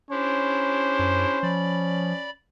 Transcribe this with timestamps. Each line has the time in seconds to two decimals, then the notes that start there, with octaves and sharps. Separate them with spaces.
0.10 C#4 D4 E4 G4 C5
0.99 F#2
1.43 F3 D5 B5